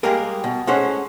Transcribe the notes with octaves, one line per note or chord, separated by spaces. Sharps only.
G3 G#3 A#3 G4 G#4 A#4
B2
G#3 A3 C#4 G#4 C5 F#5